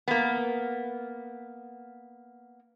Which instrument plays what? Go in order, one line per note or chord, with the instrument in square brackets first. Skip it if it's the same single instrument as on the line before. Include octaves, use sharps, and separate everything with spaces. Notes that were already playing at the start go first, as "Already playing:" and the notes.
[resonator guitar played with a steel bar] A#3 B3